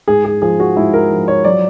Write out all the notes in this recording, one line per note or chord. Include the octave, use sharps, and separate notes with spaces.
G#2 G#4
G#4
F3 G#4
F#4
G#2 E4
A#4
F3
C#5
F#3 D5